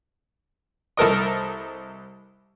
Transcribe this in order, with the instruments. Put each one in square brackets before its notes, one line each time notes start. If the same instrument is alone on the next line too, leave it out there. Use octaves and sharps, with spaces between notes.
[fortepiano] C2 A4 A#4 D#5